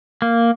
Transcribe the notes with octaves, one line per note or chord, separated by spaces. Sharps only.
A#3